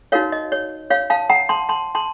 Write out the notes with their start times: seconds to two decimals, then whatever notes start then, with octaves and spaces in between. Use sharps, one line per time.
0.12 D#4 F#4 A#4 C#5 F5
0.32 D#5
0.52 C#5
0.90 C#5 F5
1.10 F5 A5
1.30 F#5 A#5
1.49 A5 C6
1.69 A5 C6
1.95 A5 C6